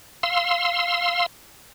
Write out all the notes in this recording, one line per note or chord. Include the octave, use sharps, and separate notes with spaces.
F5 C6 E6